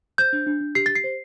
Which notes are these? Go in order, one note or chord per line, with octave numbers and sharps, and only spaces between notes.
C5 G6
D4
D4
D4
G4 C7
G4 A6
C7
C5